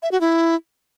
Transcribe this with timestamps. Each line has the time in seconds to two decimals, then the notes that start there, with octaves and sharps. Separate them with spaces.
0.02 E5
0.12 F#4
0.21 E4